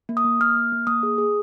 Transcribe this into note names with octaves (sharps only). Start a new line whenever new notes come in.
A#3
D#6
A#3
A#3 F6
A#3
A#3
A#3 D#6
G#4
G#4